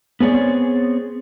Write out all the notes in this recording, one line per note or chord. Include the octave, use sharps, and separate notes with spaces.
B3 C4 G#4 C#5 D5